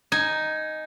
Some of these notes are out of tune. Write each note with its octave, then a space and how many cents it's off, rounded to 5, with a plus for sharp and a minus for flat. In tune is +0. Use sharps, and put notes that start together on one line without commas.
D#4 +0 G#5 +0